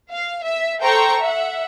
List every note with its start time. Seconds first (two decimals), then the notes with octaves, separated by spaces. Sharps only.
0.11 F5
0.44 E5
0.81 A4 C5 G5 A#5 C#6
1.21 E5 F#5